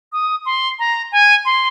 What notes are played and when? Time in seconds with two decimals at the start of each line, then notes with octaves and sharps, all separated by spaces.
0.12 D#6
0.46 C6
0.79 A#5
1.12 G#5
1.45 C6